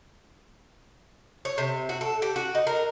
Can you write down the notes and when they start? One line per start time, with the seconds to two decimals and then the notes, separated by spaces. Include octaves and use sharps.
1.45 C#5
1.58 C3
1.89 F#4
2.01 A4
2.22 G4
2.36 F#4
2.55 D#4
2.67 A#4